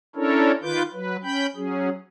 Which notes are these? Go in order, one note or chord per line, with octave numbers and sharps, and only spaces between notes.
C#4 D4 E4 A4 A#4 C#5
D#3 F4 B4 D6 G6
F#3 B4
C#4 G5 B5 G6
F#3 C#4 G#4